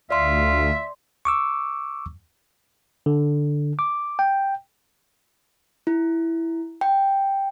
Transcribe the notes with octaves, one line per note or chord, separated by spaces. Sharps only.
D2 F4 D5 E5 C6
C#6 D6 E6
D3
D6
G5
E4
G5